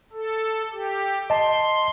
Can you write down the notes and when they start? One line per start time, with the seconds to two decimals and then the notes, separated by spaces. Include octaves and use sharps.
0.12 A4
0.72 G4
1.30 D#5 A5 C6